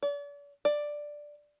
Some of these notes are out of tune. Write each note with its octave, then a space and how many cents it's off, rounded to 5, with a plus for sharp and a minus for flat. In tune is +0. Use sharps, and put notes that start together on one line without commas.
D5 -40
D5 +5